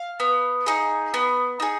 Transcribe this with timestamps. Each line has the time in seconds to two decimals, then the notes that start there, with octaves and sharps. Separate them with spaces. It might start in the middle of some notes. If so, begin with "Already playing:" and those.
Already playing: F5
0.20 B3
0.66 D#4 G#4
1.14 B3
1.60 D#4 G#4